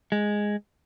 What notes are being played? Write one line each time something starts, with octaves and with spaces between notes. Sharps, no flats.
G#3